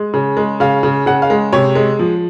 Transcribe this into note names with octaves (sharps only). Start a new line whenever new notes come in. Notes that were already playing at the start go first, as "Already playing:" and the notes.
Already playing: G#3
C#3
G#3
C#3 F5
C#3
C#3 F#5
F5
G#3
C3 C#5
G#3
F3